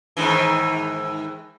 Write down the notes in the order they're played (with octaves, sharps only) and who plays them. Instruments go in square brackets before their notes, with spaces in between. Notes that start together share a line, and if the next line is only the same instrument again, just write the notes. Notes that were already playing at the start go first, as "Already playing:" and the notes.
[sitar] G#2 D#3 E3